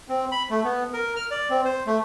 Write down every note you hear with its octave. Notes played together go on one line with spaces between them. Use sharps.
C4
B5
A3
B3
A#4
F6
D5
C4
C5
A3